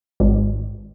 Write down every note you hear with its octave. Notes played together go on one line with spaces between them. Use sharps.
G#1